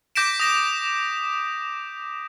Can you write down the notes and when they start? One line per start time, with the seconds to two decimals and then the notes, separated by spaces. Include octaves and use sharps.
0.15 D6 G6 A#6 B6 D7 E7
0.40 D#6 A#6 E7